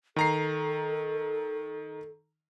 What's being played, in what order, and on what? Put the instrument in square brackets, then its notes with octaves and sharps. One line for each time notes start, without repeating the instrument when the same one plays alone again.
[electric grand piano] D#3 A#5 C7 [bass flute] A4